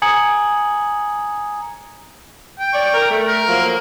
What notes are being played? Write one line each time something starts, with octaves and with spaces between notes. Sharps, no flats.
G#5 A#5 D#6 G#6 C#7 F#7
G5
C#5 D5
A#4
A3
A#4
F3 F#3 A#3